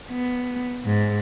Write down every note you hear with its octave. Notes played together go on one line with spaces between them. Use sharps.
B3
G#2